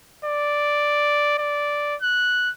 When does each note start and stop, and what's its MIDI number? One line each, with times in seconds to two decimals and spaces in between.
0.25 1.37 74
1.38 1.95 74
2.02 2.50 90